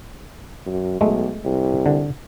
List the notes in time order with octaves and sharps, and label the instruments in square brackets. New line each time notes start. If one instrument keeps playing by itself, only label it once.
[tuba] F#2
[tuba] B1 [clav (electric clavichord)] G#3 A3
[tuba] C2
[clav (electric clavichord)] D3